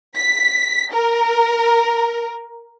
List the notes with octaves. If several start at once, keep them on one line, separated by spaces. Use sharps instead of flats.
B6
A#4